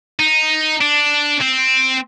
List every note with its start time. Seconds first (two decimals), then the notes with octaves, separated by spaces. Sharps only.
0.19 D#4
0.81 D4
1.41 C4